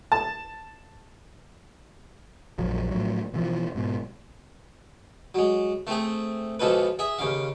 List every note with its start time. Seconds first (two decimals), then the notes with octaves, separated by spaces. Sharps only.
0.12 A5
2.58 A#1 F2 F3 F#3
2.90 A2 F3 F#3
3.34 B2 E3 F3
3.75 G#2 B2
5.35 F#3 G#3
5.87 A3 C4 G#4
6.60 B1 F3 G#3 A4 B4
6.99 G#4 E5
7.19 D#2 C#3 F5